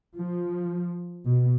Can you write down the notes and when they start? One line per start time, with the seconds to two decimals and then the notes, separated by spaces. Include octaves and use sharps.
0.16 F3
1.25 B2